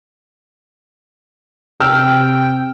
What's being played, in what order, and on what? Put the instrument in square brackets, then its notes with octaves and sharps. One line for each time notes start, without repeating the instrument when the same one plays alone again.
[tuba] C3 [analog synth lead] G5 [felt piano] E6 F6